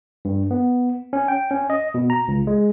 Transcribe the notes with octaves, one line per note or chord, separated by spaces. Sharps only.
G2
B3
C#4
G5
C#4
D#5
B2
A#5
C#2
G#3